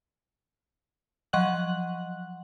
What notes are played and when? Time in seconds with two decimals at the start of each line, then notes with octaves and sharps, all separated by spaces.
1.33 F3 F#3 D#5 F#5 F#6 F#7